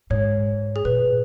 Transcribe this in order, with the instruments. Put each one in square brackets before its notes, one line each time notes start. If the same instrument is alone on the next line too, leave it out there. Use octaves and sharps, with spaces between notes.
[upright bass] G#2 [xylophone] C#5
[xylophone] G#4
[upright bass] B2 [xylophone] B4